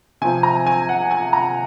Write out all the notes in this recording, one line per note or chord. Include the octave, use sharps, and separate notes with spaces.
C3 F3 C4 G#5
A#5
G#5
F#5
G#5
A#5